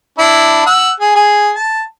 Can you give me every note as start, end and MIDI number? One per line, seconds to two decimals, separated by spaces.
0.19 0.64 62
0.19 0.64 64
0.66 0.91 78
0.66 0.91 88
1.00 1.12 68
1.15 1.51 68
1.55 1.83 81